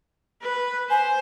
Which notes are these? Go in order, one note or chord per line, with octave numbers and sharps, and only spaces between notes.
B4
C5 G#5